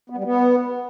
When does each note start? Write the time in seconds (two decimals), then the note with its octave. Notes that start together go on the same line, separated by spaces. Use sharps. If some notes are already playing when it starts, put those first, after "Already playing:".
0.10 B3
0.17 G3
0.24 B3